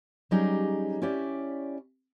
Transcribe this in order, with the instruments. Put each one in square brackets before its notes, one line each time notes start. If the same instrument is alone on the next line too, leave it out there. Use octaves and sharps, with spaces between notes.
[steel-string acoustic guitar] F#3 G3 C#4 D#4 G4 G#4
C#4 E4 G4 C#5 D5 E5